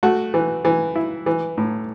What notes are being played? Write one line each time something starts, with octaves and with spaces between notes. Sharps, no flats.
A3 F#4
E3
E3
E4
E3
A2